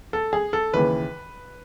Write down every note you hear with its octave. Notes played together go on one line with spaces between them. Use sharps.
A4
G#4
A4
D#2 C#3 E3 B4